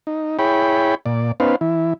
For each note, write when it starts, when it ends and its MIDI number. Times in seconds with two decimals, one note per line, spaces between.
0.07 0.37 63
0.39 0.95 64
0.39 0.95 68
0.39 0.95 73
0.39 0.95 79
0.39 0.95 83
1.06 1.32 46
1.06 1.32 74
1.40 1.56 59
1.40 1.56 61
1.40 1.56 63
1.40 1.56 71
1.40 1.56 72
1.40 1.56 77
1.61 1.93 52
1.61 1.93 64